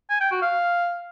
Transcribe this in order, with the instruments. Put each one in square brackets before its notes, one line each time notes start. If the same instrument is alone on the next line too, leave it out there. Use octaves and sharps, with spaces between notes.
[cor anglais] G#5
G5
F#4
F5